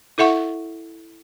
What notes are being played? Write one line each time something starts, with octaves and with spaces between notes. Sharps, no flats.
E4 A4 E5 F#5 C#6